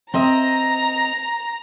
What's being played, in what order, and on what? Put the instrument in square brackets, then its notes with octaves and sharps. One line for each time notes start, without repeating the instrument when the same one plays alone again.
[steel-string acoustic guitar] C4 D#5 E5 [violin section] A#5